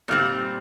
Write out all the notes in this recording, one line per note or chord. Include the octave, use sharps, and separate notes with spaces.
A#2 G3 C4 F6